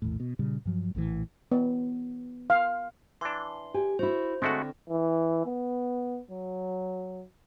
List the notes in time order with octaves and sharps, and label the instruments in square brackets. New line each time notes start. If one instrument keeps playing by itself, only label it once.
[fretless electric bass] A#1 E2 A2
B2
A#2 C#3 G3
G2 F3 F#3
A#1 A2 C3 E3
[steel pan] B3
F5
[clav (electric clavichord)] E3 D4 [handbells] C6
[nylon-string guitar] G4 G#5
[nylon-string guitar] E4 F#4 [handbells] C5
[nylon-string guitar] D3 [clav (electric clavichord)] G#3 A3 F#4 [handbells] C4
[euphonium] E3
B3
F#3